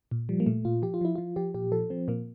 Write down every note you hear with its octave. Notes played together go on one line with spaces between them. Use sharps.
A#2
F3 G3
A#3
A#2 A3
A#2 F4
F3 G4
F4
F3 E4
F3 F4
F3 G4
A#2 G4
F3 A4
F3 C4
A#2 A#3